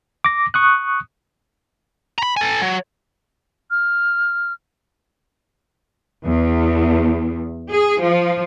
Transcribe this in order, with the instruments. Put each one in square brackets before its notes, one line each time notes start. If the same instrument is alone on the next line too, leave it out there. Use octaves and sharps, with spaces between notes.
[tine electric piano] D6 A#6
C#6 D#6 F#6
[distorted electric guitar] A#5 B5
A4 G#5
F#3
[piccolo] F6
[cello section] E2
G#4
F3